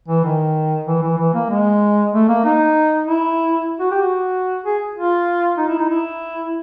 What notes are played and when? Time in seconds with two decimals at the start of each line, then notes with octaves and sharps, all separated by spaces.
0.08 E3
0.24 D#3
0.87 E3
1.03 E3
1.18 E3
1.34 A#3
1.50 G#3
2.13 A3
2.28 A#3
2.45 D#4
3.07 E4
3.80 F#4
3.91 G4
4.01 F#4
4.64 G#4
4.95 F4
5.58 D#4
5.69 E4
5.79 D#4
5.90 E4